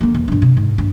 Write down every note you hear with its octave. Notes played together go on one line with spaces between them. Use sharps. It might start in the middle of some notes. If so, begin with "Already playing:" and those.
D3 A#3
E2
G2 D4
C3
G#2
G2